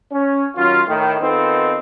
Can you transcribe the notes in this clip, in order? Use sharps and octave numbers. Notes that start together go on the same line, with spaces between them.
C#4
D#3 F#3 C#4 F4
A2 D#3
D#3 B3 C4 D#4 F4 A4